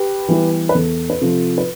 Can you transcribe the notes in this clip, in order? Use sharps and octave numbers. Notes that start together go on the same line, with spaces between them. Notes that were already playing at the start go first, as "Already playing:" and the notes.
Already playing: G4 B4
E3 G3 B3 E4
B4
E2 A4
B4
C3 F3 A4
B4